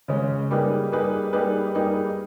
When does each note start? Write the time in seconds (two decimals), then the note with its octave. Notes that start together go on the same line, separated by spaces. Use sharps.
0.08 C#3 G#3 C#4
0.51 G3 A#3 D#4 G#4 B4
0.92 G3 A#3 D#4 G#4 B4
1.33 G3 A#3 D#4 G#4 B4
1.74 G3 A#3 D#4 G#4 B4